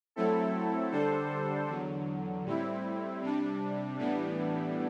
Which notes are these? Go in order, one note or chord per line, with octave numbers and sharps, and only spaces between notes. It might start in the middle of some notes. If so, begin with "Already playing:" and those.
F#3 A3 C4 E4 A4
D3 G3 D4 A4 C5
E2 D3 F#3
A2 G3 C4 E4
C3 G3 D4
A2 E3 G3 B3 D4